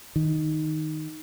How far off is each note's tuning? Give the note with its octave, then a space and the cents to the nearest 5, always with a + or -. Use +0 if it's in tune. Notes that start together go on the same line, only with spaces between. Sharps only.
D#3 +0